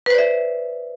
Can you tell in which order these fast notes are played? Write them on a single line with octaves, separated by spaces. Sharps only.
B4 C5 D5 E5